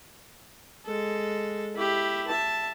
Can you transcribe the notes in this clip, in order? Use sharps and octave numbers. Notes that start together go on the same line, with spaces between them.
G#3 A4
E4 G4
E5 A5